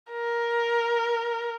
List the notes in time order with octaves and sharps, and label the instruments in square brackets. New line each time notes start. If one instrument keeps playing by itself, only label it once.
[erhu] A#4